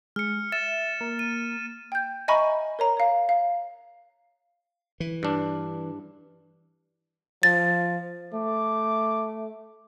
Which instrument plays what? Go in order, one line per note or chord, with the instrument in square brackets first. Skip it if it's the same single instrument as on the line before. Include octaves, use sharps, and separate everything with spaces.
[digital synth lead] G#3 [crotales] F6 C#7
[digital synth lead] E5 [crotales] A6 E7
[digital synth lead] A#3
[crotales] D#7
[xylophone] G5 G6
D#5 E5 G#5 A#5 B5 C#6
A#4 C#5 A#5
C#5 F5
F5
[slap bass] E3
[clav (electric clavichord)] G2 D4
[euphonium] F3 [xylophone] A6
[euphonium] A3 [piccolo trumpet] D6